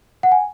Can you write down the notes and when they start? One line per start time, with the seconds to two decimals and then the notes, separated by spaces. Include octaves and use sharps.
0.23 F#5
0.32 G#5